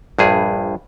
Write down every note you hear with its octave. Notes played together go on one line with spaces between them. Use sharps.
A#1 G2 G#4